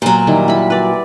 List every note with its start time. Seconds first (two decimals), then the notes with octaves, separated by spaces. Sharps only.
0.02 A#2 F#3
0.27 D#3 G3 E4
0.48 E4 B5
0.70 B4 D5